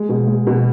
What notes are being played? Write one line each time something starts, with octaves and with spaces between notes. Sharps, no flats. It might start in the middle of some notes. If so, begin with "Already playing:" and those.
Already playing: G#3
B2
G#3
B2